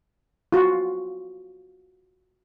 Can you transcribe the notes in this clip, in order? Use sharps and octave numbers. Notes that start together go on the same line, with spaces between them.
F4 F#4